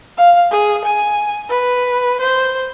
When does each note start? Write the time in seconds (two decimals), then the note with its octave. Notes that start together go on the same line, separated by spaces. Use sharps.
0.17 F5
0.51 G#4
0.85 G#5
1.49 B4
2.20 C5